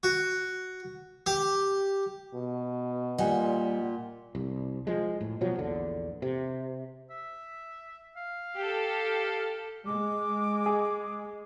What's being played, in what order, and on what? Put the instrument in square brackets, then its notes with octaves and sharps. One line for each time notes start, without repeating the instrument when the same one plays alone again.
[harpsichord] F#4
G4
[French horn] B2
[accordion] A#2 [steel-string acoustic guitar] G3 [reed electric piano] D#5 F#5 G#5
[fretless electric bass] C2
F3 G#3
A2
B2 F3 F#3
A#1 E2 D3
C3
[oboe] E5
F5
[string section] G4 A4
[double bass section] G#3 [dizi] D6
[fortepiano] G#4